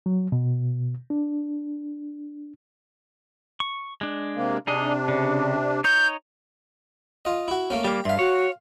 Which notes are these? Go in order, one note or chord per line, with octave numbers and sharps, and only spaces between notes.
F#3
B2
D4
C#6
G#3 D4
C3 A#3
C3 D4 D#4 G#4 D#5
C#3
D#4 C#5 G6
F4 D#5
E4 F#4
A3 A#3 C#4
G3 A#3 G4
G2 E5 F5 C6
F#4 C#5